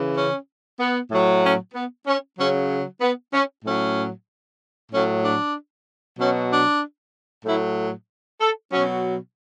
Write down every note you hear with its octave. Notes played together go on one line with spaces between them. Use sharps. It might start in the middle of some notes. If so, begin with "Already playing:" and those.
Already playing: C#3 E3
C#4
B3
A2 F#3
C#4
B3
C#4
C#3 F#3 C#4
B3
C#4
A2 F#3 C#4
A2 F#3 C#4
D4
B2 F#3 C#4
D4
A2 F#3 E4
A4
B2 F#3 C#4